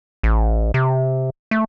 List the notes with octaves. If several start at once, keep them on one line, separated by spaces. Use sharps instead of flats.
A1
C3
A3